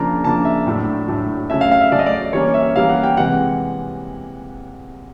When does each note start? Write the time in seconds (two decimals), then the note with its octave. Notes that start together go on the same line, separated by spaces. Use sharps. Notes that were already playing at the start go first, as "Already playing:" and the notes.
Already playing: C#3 F3 A#3 D4 A#5
0.24 C#3 F3 A#3 D4 A5
0.45 E5
0.67 A2 F#3 A3 D4
1.08 A2 F#3 A3 D4
1.50 C#3 F#3 A3 C#4 E5
1.61 F5
1.71 F5
1.81 E5
1.91 C#3 F#3 A3 C#4 D5
1.99 D#5
2.06 D5
2.33 E3 G3 A#3 C#4 C#5
2.54 E5
2.76 E3 G3 A#3 C#4 F5
2.89 F#5
3.03 G5
3.17 C3 E3 G#3 F#5